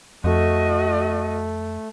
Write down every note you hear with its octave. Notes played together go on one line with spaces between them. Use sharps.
F2 A3 F#4 D#5